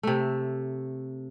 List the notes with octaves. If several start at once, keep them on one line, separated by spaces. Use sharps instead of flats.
C3 A3